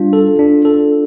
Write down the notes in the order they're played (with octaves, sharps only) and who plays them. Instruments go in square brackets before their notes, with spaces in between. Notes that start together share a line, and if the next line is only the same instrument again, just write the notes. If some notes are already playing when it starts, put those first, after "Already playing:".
Already playing: [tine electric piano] G3 D4 [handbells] F4
[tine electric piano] A4
D4
A4